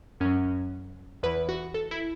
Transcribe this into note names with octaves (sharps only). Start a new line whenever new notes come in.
F#2 F#3 C#4
E2 E3 B4
F#4
A4
E4